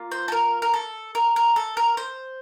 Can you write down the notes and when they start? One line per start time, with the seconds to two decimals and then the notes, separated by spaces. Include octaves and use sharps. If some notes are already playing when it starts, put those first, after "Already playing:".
Already playing: A#3 F4
0.12 C5
0.28 A4
0.32 A#4
0.62 A#4
0.74 A4
1.15 A#4
1.36 A#4
1.56 A4
1.77 A#4
1.97 C5